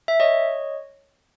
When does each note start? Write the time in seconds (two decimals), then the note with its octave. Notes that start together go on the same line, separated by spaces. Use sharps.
0.08 E5
0.20 C#5 D#5